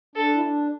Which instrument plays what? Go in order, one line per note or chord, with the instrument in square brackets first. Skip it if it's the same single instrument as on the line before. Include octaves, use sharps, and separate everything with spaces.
[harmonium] D4 [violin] A4
[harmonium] E4
D4